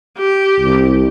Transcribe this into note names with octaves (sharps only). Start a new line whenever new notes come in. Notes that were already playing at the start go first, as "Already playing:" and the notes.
G4
C2